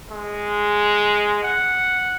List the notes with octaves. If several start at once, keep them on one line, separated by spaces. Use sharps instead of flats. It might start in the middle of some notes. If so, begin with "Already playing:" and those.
G#3
F#5